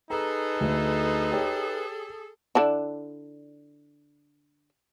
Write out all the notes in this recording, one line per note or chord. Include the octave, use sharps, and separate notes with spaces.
D#4 G#4 A4 B4 A#5
D2
G4 C#5
D3 D4 E4